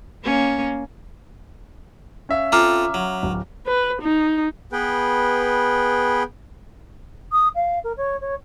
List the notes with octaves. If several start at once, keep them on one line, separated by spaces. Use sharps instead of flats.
A#3 C#4
C#4 E5 F5
C4 F4 A4 A#5 D6 F6
F#3
D1
B4
D#4
B3 G#4 B4 G5
D#6
F5
A#4
C#5
C#5